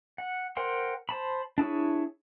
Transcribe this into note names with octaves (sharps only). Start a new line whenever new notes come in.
F#5
A#4 C5 F#5 G5 C6
C5 A5 B5
D4 E4 G#4 C#5